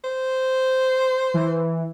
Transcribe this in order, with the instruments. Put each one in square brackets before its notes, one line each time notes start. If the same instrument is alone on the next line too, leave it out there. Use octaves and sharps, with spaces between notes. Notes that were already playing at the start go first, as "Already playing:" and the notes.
[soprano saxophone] C5
[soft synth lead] E3